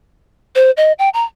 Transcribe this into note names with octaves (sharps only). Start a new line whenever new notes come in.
C5
D#5
G5
A#5